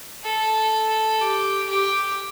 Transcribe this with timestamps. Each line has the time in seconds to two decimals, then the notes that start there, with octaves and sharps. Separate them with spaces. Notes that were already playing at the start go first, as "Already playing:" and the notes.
0.24 A4
1.21 G4
1.69 G4